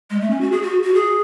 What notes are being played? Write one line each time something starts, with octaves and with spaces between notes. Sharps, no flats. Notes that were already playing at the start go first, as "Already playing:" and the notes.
G#3
A3
C#4
F#4
G#4
F#4
F#4
G#4